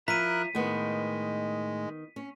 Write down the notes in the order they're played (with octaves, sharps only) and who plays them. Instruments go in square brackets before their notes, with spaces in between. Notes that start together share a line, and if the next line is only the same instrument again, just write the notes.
[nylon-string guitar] F3 [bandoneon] E4 A#4 F#6 [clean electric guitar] E5 A#5 [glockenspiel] B6 D#7
[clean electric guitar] A2 [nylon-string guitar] D#3 B3 [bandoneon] G#3
[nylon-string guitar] C#4